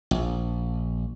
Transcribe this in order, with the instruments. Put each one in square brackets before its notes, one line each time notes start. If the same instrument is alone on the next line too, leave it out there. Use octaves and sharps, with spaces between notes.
[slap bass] A#1